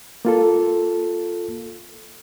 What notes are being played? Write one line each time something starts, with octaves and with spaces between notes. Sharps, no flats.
A#3 F4 A4